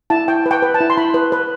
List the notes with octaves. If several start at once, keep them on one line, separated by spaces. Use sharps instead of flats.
E4 A5
E4 G5
B4
G5
B4
A5
E4
C6
E4 B5
B4
B4